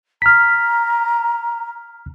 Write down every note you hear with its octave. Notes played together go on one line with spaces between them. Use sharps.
A#5 F6 B6